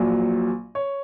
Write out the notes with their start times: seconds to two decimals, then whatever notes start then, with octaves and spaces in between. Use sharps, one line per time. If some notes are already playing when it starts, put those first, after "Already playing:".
Already playing: A#1 A#2 F#3
0.75 C#5